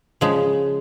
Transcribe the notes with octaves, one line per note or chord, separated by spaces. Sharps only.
C#3 F3 G#3